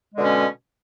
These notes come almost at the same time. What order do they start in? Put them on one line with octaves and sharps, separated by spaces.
G#3 D3 B2 C#4